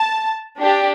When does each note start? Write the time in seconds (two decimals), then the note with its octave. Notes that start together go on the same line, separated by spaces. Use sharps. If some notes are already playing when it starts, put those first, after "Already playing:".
Already playing: A5
0.57 D4 G4